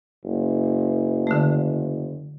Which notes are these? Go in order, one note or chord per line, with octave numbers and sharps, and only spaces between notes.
F#1
D3 A3